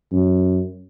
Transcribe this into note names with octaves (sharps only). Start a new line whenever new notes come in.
F#2